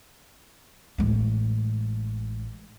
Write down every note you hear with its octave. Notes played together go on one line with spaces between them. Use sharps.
A1 G#3